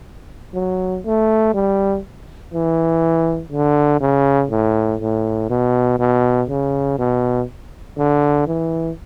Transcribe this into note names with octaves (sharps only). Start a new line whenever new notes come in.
F#3
A3
G3
E3
D3
C#3
A2
A2
B2
B2
C#3
B2
D3
E3